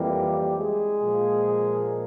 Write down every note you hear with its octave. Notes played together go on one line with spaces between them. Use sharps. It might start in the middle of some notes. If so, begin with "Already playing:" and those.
Already playing: F2 E3 G3 A#3 G4
G#3 G#4
A#2 F3 A#3